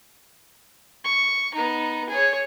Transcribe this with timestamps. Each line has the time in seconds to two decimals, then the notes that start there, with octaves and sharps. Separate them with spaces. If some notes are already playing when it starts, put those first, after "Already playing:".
1.04 C#6
1.54 B3 D#4
2.10 G#4 C#5